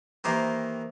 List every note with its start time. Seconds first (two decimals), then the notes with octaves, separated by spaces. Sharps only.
0.24 D#3 E3 A#3 G4 C5